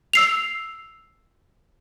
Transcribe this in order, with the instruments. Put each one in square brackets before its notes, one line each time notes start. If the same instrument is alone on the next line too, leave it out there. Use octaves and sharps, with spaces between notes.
[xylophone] E6 C7 F7